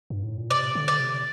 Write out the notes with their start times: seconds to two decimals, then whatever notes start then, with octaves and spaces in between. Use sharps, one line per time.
0.10 G2
0.23 A2
0.37 A#2
0.50 C3 D5
0.75 D3
0.88 D5
1.00 C3